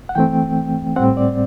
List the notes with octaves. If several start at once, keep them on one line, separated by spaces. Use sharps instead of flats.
F#5
E3 A3 C4 G5
A2 G3 C4 F#5
D5